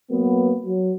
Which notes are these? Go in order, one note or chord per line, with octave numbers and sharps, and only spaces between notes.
F#3 A#3 B3
F#3